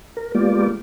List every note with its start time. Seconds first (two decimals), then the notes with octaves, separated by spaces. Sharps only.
0.17 A#4
0.35 G#3 A#3 B3 F4 G4 D5